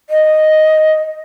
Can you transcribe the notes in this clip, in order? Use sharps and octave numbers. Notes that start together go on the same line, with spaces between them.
D#5